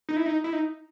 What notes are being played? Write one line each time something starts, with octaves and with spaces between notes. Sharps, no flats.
D#4
E4
D#4
E4
D#4